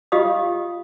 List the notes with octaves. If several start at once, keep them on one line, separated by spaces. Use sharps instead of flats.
F4 G4 D#5 F5 D#6